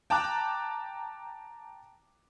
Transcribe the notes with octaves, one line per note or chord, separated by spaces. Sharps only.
G5 A5 A#5 D6 F#6